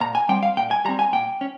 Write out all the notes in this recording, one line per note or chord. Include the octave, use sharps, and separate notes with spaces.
A#2 A#5
G#5
G3 C4 G5
F5
A#2 G5
G#5
G3 C4 A#5
G#5
A#2 G5
C#4